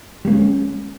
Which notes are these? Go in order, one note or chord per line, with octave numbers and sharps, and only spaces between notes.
G3 G#3 A#3 C#4